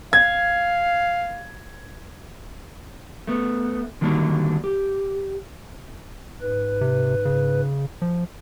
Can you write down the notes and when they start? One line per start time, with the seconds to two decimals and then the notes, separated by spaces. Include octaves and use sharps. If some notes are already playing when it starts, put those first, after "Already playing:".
0.13 F5 G#6
3.27 A3 B3
4.01 D3 D#3 F#3 G3 A#3 D4
4.64 G4
6.41 G#2 B4
6.81 C3
7.25 C#3
8.02 F3